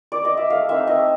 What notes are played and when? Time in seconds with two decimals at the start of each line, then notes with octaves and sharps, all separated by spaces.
0.12 D5
0.25 D#5
0.37 E5
0.50 A3 F5
0.69 C4 D#4 E5
0.87 A3 D#5